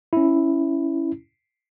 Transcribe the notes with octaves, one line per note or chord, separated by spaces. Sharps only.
C#4 E4